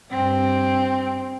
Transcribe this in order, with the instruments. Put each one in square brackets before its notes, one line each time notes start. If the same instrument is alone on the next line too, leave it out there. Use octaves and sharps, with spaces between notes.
[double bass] G2 [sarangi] C4